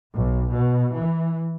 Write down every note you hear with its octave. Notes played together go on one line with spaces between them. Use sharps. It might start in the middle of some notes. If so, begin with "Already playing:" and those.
B1
B2
E3